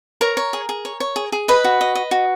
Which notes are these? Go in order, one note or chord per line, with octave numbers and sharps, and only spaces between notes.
A#4 C#5 A#5
C#5
G#4
G#4
C#5
C#5
G#4
G#4
B4 D#5 B5
F#4
D#5
D#5
F#4